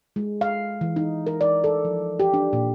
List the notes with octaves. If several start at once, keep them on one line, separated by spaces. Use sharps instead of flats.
G#3
F5
E3
D#4
A#4
D5
A4
F3
G4
D4
A#2